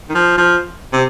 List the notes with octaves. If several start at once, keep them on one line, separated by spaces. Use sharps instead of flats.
D#3
F3
F3
C3